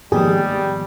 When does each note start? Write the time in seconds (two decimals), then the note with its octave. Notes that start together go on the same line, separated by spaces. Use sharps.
0.12 G#2 D#3 F3 G3 A#3 B3 G4 G#4